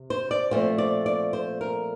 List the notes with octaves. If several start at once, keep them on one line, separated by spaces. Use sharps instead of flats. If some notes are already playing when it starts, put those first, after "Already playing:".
Already playing: C3
C5
D5
A#2 F3 A3 C4 C5
D5
D5
C5
A#4